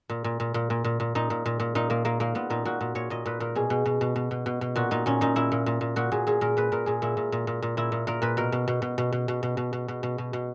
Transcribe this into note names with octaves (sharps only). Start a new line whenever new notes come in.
A#2
A#2
A#2
A#2
A#2
A#2
A#2
A#2 D#4
A#2
A#2
A#2
A#2 D#4
A#2 A#3
A#2 A#3
A#2 A#3
A#2 B3
A#2 D#4
A#2 F#4
A#2
A#2 C#5
A#2 D#5
A#2 B4
A#2 A#4
B2 G#4
B2
B2
B2
B2
B2
B2
B2
A#2 F#4
A#2 D#4
A#2 C#4
A#2 D#4
A#2 E4
A#2
A#2
A#2
A#2 F#4
A#2 G#4
A#2 G#4
A#2 A#4
A#2 B4
A#2 A#4
A#2 G#4
A#2 E4
A#2
A#2
A#2
A#2
A#2 E4
A#2
A#2 A#4
A#2 B4
B2 A#4
B2
B2
B2
B2
B2
B2
B2
B2
B2
B2
B2
B2
B2